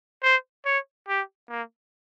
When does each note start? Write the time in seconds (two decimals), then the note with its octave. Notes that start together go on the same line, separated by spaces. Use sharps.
0.23 C5
0.65 C#5
1.08 G4
1.49 A#3